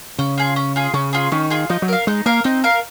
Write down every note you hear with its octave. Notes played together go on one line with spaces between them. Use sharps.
C#3 C#4
F4 G#4
C#4
F4 G#4
C#3 C#4
F4 G#4
D#3 C#4
F4 G#4
F3 D#4
F#3
A#4 F5
G#3 D#4
A#3 A#4 F5
C4 D#4
A#4 F5